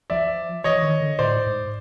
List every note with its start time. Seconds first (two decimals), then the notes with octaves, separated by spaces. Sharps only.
0.10 F3 D5 E5
0.64 E3 C#5 D#5
0.82 D#3
1.01 D3
1.19 A2 C5 D5
1.46 G#2